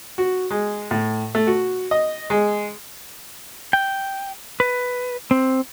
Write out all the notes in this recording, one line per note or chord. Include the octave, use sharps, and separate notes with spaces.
F#4
G#3
A2
A3
F#4
D#5
G#3
G5
B4
C4